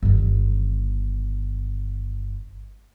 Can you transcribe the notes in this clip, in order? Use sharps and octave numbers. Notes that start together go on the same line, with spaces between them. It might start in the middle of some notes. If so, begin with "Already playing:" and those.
G1 D#3